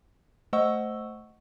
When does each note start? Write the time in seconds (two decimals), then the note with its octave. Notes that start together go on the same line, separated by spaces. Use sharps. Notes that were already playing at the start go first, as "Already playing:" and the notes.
0.53 A3 C5 D#5 F#5 C#6 E6